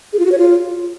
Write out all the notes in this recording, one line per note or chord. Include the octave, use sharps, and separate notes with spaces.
G#4
F4
F#4
C#5
F4